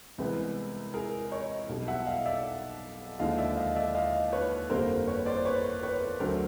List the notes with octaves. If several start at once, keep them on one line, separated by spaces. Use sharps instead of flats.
C2 C3 E3 G#3 B3
G#4 A#4
C#5 D#5
B1 B2 G3
E5 F#5
D#5 F5
D5 E5
D#2 D3 F3 G#3 D#5 F5
D5 E5
D#5 F5
D5 E5
D#5 F5
B4 C#5
G1 F2 D3 G3 A#3 A#4 C5
B4 C#5
C5 D5
B4 C#5
B4 C#5
D2 D3 F#3 A3 D4 A#4 C5